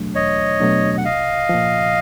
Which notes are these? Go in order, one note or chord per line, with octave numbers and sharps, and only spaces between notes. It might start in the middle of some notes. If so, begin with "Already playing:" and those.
Already playing: E2 B2 F#3 A3 D4
E2 C#5 D#5
B2 F#3 A3 D4
F#5
C2 D#5 F5
A#2 F3